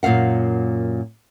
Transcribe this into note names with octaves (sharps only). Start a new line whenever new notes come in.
F#2 A#2 C#3 F5 F#5